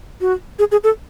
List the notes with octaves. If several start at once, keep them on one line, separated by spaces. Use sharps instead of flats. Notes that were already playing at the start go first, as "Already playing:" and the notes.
F#4
G#4
G#4
A4